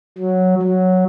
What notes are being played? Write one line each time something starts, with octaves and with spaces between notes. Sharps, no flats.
F#3
F#3